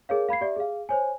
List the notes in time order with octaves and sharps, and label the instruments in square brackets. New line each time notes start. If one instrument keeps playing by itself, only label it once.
[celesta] G#4 A#4 C#5 F5
F5 B5 G#6 C7
G4 D5 E5
G#4 F5
C5 C#5 G#5